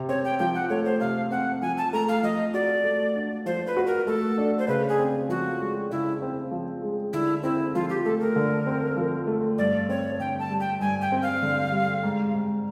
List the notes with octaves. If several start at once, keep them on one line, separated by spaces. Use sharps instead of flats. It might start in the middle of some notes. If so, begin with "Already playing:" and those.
Already playing: C3
C4 C#5
G5
F3 G5
F#5
A3 C#5
C5
C3 F5
C4 F#5
F3 G#5
A5
A3 A#5
F5
F3 D#5
F#4 D5
A3
D4
F3 C5
B4
F#4
A#4
A3 A4
D4
C5
C#3 B4
G#4
C4
F3 F#4
G#3
C#3 E4
C4
F3
G#3
D3 E4
C4 E4
F3 F4
G4
A3 A4
A#4
D3
C4
F3
A3
G2 D5
C4 C#5
D3 G5
A5
G3
G5
G2 G#5
G5
C4
F5
D3
G3
G#2
G#2